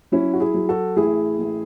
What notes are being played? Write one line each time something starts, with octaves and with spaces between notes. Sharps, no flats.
F#3 C#4 E4
F#4
E4 G#4
F#3
F#4 A4
A1 E4 G#4
A1